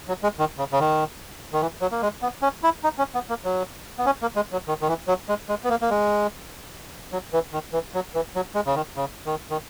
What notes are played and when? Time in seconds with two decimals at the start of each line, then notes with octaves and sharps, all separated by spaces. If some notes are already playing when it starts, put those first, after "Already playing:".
0.08 F#3
0.23 G#3
0.39 D#3
0.58 C#3
0.72 C#3
0.80 D#3
1.53 D#3
1.61 E3
1.81 F#3
1.92 A#3
2.02 G#3
2.22 B3
2.42 C#4
2.63 E4
2.84 D#4
2.98 C#4
3.14 B3
3.29 A#3
3.44 F#3
3.98 B3
4.06 C#4
4.22 A#3
4.36 G#3
4.52 F#3
4.68 D#3
4.81 D#3
4.88 E3
5.08 F#3
5.28 G#3
5.49 G#3
5.64 B3
5.69 A#3
5.82 A#3
5.90 G#3
7.12 F#3
7.33 E3
7.53 D#3
7.73 E3
7.94 F#3
8.15 E3
8.35 F#3
8.55 G#3
8.66 C#3
8.75 D#3
8.96 C#3
9.26 D#3
9.50 D#3